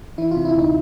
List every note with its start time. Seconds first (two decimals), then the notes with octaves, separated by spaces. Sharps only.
0.18 E3 E4
0.31 C3 F4
0.45 E4
0.54 D2 D#4